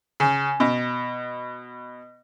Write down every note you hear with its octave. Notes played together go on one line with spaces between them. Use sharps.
C#3
B2